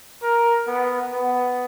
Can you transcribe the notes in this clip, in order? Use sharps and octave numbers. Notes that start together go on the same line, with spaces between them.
A#4
B3
B3